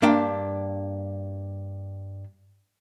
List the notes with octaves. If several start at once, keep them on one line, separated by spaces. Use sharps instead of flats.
G2 A#3 D4 G5